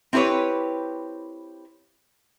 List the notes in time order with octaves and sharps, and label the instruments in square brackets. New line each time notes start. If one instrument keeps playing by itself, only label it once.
[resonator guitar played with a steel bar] C4 E4 G4 B4 C#5